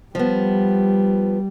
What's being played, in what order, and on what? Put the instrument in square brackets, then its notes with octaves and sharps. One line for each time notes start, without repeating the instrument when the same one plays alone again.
[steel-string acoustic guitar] F3 B3 [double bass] G3